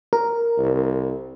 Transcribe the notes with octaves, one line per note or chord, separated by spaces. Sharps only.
A#4
C2